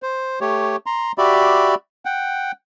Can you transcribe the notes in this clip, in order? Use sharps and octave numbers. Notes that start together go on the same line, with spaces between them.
C5
A3 G4 C#5
A#5 C6
F#4 G4 D5 E5 B5
F#5 G5